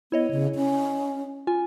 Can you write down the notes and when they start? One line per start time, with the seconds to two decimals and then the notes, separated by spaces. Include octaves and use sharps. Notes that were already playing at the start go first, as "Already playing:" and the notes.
0.12 B3 E4 C#5 D#5
0.31 C#3
0.55 C#4
1.47 F4 G#5